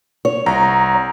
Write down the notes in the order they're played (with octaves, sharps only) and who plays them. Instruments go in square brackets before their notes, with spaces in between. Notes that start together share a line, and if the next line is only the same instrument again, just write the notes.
[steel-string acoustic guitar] C#5
[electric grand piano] C2 A#5